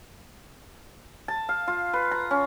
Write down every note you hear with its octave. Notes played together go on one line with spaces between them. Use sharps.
A5
F5
F4
B4
A#5
C#4